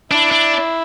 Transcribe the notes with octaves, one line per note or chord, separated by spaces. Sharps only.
D4 E4
D4